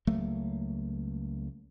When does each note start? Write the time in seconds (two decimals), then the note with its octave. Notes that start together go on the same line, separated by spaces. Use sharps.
0.07 C#2 F#3 A3 A#3